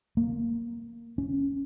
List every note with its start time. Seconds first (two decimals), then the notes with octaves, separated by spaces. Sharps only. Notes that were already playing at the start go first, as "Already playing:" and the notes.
0.17 A#3
1.18 C#4